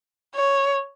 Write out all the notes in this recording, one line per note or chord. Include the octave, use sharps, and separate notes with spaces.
C#5